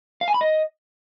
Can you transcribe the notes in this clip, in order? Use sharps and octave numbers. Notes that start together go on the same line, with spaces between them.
F5
G#5
B5
D#5